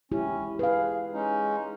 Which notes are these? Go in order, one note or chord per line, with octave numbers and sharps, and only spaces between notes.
G#3 C#4 E4 G4
G#4 B4 F5
G#3 C#4 D#4